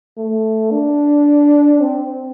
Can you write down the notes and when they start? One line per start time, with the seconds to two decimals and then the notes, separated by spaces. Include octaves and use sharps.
0.18 A3
0.71 D4
1.81 C4